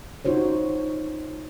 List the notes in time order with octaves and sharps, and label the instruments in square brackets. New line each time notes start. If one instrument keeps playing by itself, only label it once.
[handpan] D#4 F4 F#4 C5 C#5